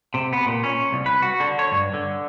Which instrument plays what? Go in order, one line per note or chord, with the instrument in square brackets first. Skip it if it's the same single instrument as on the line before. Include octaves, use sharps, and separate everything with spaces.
[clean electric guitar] C3
B3
A#2
C#4
C2
B4
F#4
D3
C#5
G2
D3